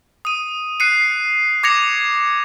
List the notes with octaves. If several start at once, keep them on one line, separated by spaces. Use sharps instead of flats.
D#6 D#7
F#6 C7 C#7 D#7
D6 G#6 A#6 C#7 F7